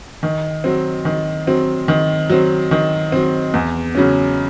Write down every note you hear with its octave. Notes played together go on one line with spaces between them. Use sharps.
D#3
F#3 C4
D#3
F#3 C4
D#3
F#3 C4
D#3
F#3 C4
E2
C#3 F#3 C#4